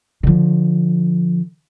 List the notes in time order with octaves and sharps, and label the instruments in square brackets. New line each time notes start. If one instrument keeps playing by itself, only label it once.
[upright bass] D3 F3